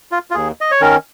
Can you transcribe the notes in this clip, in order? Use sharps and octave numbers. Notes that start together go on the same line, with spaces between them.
F4
F4
D#2 G#4
D#5
C#5
D#3 C#4 A#4